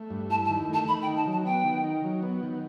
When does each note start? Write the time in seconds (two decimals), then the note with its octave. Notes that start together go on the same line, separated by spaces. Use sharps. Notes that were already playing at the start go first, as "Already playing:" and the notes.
Already playing: A3
0.11 G2
0.29 E4 A5
0.45 A5
0.49 D#3
0.69 A3 A5
0.88 D#3 B5
1.02 G5
1.07 D#4
1.16 A5
1.27 F#3 A5
1.45 B3 G5
1.65 D#3
1.84 D#4
2.04 F#3
2.22 B3
2.43 D#3